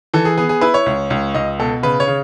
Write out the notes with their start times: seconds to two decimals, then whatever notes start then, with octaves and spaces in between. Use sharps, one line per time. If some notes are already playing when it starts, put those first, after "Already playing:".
0.14 E3 A4
0.25 G#4
0.37 B3 G#4
0.49 G#4
0.61 E4 B4
0.74 C#5
0.86 C#2
1.10 C#2
1.35 C#2 D#5
1.59 B2 A4
1.83 C#3 B4
2.00 C#5
2.08 C#3